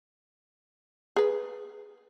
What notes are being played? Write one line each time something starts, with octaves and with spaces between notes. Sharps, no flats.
G#4 B4